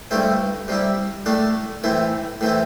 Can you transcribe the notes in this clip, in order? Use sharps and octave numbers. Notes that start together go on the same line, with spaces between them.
G2 D3 A3 C4 E4
C3 G3 E4
A2 A3 D4
A2 E3 C4 E4
A2 E3 C4 E4